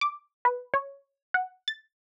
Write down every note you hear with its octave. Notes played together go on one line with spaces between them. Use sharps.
D6
B4
C#5
F#5
A6